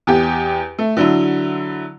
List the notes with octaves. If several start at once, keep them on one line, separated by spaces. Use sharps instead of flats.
E2 G4
A3
D3 F#3 E4